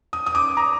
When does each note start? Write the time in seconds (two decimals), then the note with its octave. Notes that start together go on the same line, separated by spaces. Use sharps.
0.13 D#6
0.26 D#6
0.35 D6
0.57 A#5